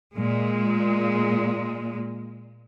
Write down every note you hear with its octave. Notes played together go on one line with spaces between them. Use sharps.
A#2 G#3